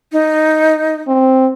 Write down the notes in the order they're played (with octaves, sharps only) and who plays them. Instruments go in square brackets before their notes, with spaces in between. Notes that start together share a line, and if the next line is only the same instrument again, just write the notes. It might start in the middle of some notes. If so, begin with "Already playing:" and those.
[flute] D#4
[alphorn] C4